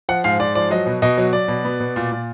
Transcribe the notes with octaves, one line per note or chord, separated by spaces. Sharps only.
F3 F#5
G#2 F5
G#2 D5
F3 D5
F#3 D#5
B2
B2 D#5
F#3
F#3 D5
B2
B3
B2
A#2
A#2